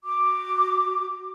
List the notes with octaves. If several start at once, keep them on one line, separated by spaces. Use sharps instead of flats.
F#4 D6